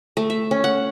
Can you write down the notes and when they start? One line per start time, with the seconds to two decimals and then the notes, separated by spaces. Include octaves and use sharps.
0.17 A3
0.30 E5
0.51 C#4
0.64 F#5